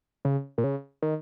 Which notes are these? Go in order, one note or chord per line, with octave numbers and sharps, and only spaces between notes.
C#3
A#2
C#3
D#3